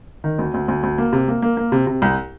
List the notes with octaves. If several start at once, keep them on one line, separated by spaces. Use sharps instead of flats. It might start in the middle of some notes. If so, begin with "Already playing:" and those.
D#3
D2
D2
D2
D2
A#3
C3
A#3
A#3
A#3
C3
C3
C2